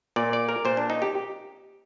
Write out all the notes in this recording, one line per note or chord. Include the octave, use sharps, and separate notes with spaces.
A#2 D5
D5
A#4
A#2 C5
D4
D#4
G4